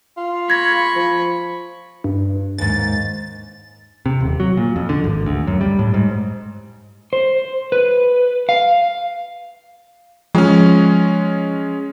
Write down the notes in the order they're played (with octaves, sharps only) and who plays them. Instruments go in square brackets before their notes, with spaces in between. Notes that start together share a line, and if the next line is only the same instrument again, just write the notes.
[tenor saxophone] F4
[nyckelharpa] B5 C#6 [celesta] G#6 A#6
[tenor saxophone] F3
[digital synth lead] G2
[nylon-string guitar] D#2 G#2 [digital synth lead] A6
[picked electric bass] C3
D#1
F#3
A#2
F2
D3
G#1
D2
F#2
G3
A2
G#2
[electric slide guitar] C5
B4
F5
[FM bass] F3 [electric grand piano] G#3 C#4